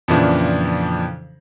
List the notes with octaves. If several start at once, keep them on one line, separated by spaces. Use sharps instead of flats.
F2 A#2 C#3 E3 F3 D4